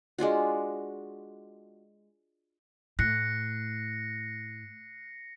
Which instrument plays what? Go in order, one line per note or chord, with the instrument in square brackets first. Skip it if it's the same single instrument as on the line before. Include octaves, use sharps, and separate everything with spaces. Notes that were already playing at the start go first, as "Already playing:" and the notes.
[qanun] G#3 D4 F4 F#4
[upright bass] A2 [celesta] F#6 [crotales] A#6 C7 C#7